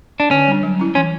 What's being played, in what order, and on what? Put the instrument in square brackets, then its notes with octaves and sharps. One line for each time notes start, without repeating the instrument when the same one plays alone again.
[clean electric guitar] D4
[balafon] D3 [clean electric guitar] C#4
[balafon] G3 D4
F#3
C#4 E4
[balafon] E3 [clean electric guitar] C#4